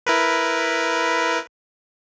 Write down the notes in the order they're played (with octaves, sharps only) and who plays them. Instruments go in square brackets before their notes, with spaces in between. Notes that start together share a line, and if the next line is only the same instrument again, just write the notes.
[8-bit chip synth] E4 A#4 B4